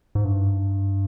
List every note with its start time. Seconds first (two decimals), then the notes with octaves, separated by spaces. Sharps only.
0.15 G#2
0.24 G2